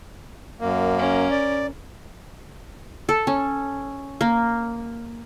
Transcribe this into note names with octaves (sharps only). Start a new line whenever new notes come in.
F#2 A#3
C#4 A#4
D5
A4
C#4
A#3